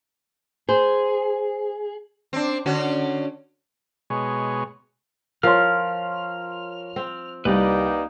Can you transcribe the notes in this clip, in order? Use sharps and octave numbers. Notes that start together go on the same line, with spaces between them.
G#4 C5
C4 D4
D3 C#4 F#4
B2 G#3 C#5
F3 A#4 C#5 C6 F6
C4
C2 G3 A#3 D#4 G4 B4 D5